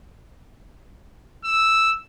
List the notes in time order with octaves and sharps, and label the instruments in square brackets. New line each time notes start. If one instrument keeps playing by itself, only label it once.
[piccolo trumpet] E6